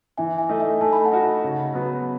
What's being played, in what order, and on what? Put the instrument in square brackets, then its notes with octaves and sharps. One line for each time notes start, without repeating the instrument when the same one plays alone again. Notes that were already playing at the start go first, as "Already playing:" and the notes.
[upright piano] E3 [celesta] E5 G#5
[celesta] E5 G#5
[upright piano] A3 D#4
[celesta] E5 G#5
[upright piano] A3 [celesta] A5
[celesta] B5
F#5 A5
[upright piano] D#4 F#4
C#3
F#3 B3